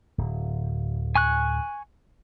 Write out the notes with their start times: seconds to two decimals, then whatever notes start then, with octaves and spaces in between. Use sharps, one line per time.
0.18 D1
1.15 G#5 C#6 F#6